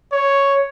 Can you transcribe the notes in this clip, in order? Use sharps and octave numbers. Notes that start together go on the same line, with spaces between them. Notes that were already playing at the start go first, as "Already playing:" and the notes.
C#5